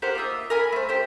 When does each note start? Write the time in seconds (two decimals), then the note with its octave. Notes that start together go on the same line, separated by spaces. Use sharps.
0.02 G4 A#4 C5 F#5
0.15 A#3 F4 D#5 E5
0.50 A#4 G#5 B5
0.72 A3 C5
0.89 G4 A#4 C5